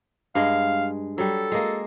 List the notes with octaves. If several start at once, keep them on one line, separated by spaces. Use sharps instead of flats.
G2 G#3 F5
F#3 G3 A4
G#3 A#3